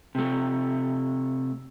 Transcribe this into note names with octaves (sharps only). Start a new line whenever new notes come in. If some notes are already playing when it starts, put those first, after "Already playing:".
C3 A3